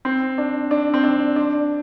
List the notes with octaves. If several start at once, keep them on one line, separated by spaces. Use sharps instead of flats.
C4
D4
D4
C4
D4
D4